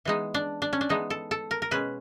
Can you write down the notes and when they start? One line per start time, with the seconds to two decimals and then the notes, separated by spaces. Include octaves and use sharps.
0.05 E3 G#3 B3 D#4
0.34 D4
0.62 D4
0.73 C#4
0.81 D4
0.89 E3 G#3 B3 D#4
1.10 A4
1.31 A4
1.51 A#4
1.62 A#4
1.71 B2 G#3 C#4 B4